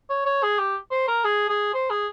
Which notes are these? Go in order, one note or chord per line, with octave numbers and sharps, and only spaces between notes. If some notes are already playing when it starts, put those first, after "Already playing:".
C#5
C#5
G#4
G4
C5
A#4
G#4
G#4
C5
G#4